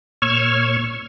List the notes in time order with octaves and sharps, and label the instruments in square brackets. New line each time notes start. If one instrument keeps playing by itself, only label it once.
[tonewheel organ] A#2 C#5 C#6 E6 F6 G#6